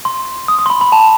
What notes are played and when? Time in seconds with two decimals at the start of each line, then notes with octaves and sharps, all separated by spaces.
0.05 C6
0.48 D#6
0.59 D#6
0.66 C6
0.70 B5
0.81 B5
0.92 A5